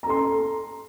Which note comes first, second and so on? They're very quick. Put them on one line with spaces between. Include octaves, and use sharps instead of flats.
A#5 A4 C6